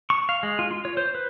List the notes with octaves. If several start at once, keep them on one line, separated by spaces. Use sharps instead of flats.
C#6
F5
G#3
F4
F4
C#5
C5
B4